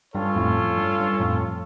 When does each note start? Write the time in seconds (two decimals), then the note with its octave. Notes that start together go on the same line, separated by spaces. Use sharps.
0.14 G2 C#4 F4 A4 C#5
0.36 F2 A2
0.78 G2
1.00 G2
1.20 F2 A2